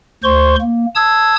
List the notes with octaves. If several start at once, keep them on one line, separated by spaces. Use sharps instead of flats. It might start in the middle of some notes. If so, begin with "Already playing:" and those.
D2 C5 C6 C#6
A#3
A5 D#6 E6 G#6